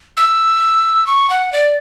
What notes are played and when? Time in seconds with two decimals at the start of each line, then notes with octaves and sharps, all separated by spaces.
0.17 E6
1.07 C#6
1.30 F#5
1.53 D5